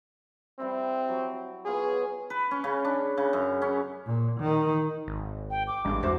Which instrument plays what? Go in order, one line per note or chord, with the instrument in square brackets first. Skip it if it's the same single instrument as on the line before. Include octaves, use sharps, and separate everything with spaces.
[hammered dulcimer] G3 E4 G4 [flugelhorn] C4
[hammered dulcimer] F#3
[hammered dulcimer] B3 F4 C#5 [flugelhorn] G#4
[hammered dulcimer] B4
C#4
C#3
D4
C#3
F#2
C#4
[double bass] A#2
D#3
[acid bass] G#1
[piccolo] G5
D6
[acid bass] A1 [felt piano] G2 G#3
[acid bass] E2 [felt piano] F#4 C5